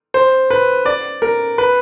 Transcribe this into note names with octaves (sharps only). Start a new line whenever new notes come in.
C5
B4
D5
A#4
B4